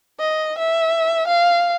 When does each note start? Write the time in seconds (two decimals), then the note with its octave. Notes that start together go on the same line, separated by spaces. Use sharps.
0.19 D#5
0.59 E5
1.28 F5